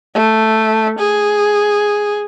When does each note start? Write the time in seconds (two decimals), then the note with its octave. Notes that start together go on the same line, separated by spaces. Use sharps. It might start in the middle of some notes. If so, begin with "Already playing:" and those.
0.15 A3
0.99 G#4